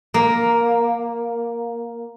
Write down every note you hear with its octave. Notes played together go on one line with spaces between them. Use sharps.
A#3